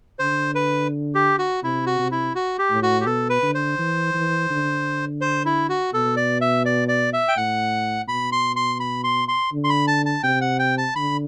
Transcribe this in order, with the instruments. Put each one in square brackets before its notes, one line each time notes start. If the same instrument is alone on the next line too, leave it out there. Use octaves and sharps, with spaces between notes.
[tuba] D3 [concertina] C5
[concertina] B4
G4
F#4
[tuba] C3 [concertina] E4
[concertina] F#4
[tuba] C3
[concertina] E4
F#4
G4
[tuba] A2
[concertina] F#4
G4
[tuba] B2 [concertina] A4
[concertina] B4
[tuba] D3
[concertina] C5
[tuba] E3
E3
D3
[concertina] C5
E4
F#4
[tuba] B2 [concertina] A4
[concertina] D5
E5
D5
D5
E5
G5
[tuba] A2 [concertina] F#5
[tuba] B2 [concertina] B5
[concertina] C6
C6
B5
C6
C6
[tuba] D3
[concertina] C6
B5
A5
A5
[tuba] C3 [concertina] G5
[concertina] F#5
G5
A5
[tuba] D3 [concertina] B5